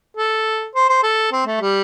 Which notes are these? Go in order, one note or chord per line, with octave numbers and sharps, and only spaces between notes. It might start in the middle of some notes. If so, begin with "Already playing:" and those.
A4
C5
C5
A4
C4
A3
G3